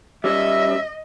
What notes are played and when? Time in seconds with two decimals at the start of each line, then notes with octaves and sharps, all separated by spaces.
0.24 G3 C#4 D#5 E5